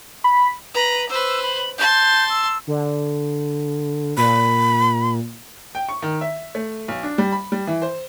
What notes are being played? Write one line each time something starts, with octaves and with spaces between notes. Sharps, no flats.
B5
B4 A#5
B4 C5 E6
B5
A5 C6 G6
E6
D3
A#2 B5
G5
C#6
D#3
E5
A3
B1
D4
G3
B5
G3
E3
C5